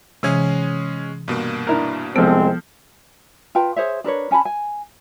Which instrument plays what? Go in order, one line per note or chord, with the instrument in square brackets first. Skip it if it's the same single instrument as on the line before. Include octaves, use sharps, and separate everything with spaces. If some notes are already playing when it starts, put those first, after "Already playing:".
[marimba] C3 E3 [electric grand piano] G#3 C#4 G#4
[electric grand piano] G2 B2 A#3
[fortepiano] D4 E4 A#4
[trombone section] C2 G#3 C4 [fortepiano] F3 A4 [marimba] B3
[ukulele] F4 B4 G5 A5
G#4 C5 C#5 E5
D4 A#4 B4 C#5
C#4 G#5 A5 B5
G#5